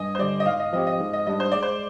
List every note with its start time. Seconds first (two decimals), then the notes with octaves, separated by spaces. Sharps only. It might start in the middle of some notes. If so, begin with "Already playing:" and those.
Already playing: G2 D#5 G#5
0.15 C5
0.19 D3 G3 D5
0.40 D#5
0.46 G#2 F5
0.60 D#5
0.73 F3 C4 G4 D#5
0.87 D#5
1.00 G#2
1.13 D#5
1.27 G3 D4 D#5
1.40 C5
1.52 G#3 D5
1.62 C5